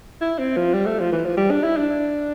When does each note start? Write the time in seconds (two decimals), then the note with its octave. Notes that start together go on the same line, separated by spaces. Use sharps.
0.21 E4
0.39 C4
0.57 F3
0.73 G3
0.86 A3
0.99 F3
1.12 E3
1.25 F3
1.37 G3
1.50 D4
1.64 E4
1.77 D4